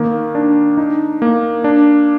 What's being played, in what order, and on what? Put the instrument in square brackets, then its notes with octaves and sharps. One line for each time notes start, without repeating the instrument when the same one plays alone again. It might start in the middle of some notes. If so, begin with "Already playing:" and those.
Already playing: [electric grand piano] D#3 A#3
D4
D#4
A#3
D4